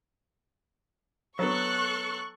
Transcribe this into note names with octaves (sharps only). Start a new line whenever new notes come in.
F#3 B3 A4 C#6 F#6